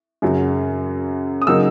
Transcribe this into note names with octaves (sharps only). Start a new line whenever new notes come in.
F#2 C#3 F#3
D#6
C#3 F#3 A#3 D#4 E6